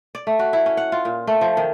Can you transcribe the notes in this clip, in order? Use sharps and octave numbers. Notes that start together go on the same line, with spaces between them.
D5
A3
F#4
E4
C#4
F#5
F4
A#2
A3
F3
D#3